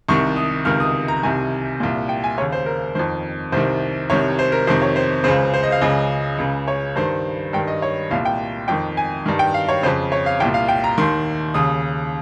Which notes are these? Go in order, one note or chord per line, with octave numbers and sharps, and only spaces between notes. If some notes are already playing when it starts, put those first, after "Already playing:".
C2 C3 D#3 C#6
D#6
C#2 C3 D#3 F6
D#6
A#5
C2 C3 D#3 G#5
C2 A#2
G5
G#5
D#2 C#3 C#5
C5
A#4
F2 D#3 C5
C2 C3 D#3 C5
C2 C3 D#3 C#5
C5
A#4
F2 C3 D#3 C5
C#5
C5
C#2 C#3 C5
C5
D#5
F5
C#2 C#3 D#5
C#2 C#3
C#5
G2 D#3 C5
G2 D#3 G5
D#5
C#5
C2 A#2 F5
G5
F2 D#3 G5
G#5
G2 D#3
G5
F5
C#5
F2 C#3 C5
C#5
F5
C2 A#2 G5
F5
G5
A#5
D#2 D#3 C6
D#2 C#3 D#6